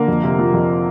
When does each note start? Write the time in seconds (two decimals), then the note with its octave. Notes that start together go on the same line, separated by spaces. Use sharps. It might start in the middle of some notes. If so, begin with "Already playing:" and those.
Already playing: D3 A#3
0.08 F2
0.23 C3
0.39 F3
0.54 F2